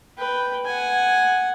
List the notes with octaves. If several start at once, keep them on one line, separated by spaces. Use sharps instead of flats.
B4 G5
F#5 G#5